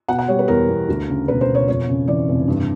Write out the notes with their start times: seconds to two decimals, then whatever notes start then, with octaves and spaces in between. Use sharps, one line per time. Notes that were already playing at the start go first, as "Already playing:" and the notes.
0.08 B2 F#5
0.19 F#5
0.28 G3 C#5
0.39 B4
0.48 E2 A#4
0.68 E2
0.89 D2
1.09 C#3
1.28 E1 B4
1.41 C5
1.49 E1
1.55 C#5
1.68 F2 C#5
1.88 C#3
2.08 E3 D5
2.29 F1
2.48 G2